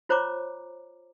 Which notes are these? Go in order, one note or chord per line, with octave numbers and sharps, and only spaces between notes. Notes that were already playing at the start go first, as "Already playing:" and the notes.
F4 C5 C#5 A#5 D6